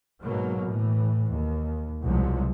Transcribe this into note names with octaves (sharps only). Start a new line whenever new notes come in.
G#2 B2 F#3 A#3
A2 E3
D#2
C2 B2 F3 F#3 G#3